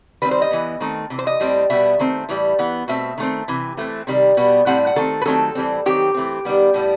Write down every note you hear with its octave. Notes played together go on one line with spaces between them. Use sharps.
D#3 G3 C4 B4
C5
D#5
E3 B3
D#3 A3 C4
C3 E3
C5
D#5
A2 G3 C4
B2 G3 B3 E5
D#3 A3 C4
A2 E3 G3
E3 B3
B2 A3 C4 E5
D#3 A3 C4
C3 E3
E3 A3 C4
C3 D#3 G3
B2 G3 B3
A2 G3 C4 F#5
F#5
D#3 A3 C4 A4
B4
D#3 F#3 A3 C4 A4
A2 E3 G3 C4
D#3 F#3 C4 G4
E3 A3 C4
D#3 G3 B3
A2 G3 B3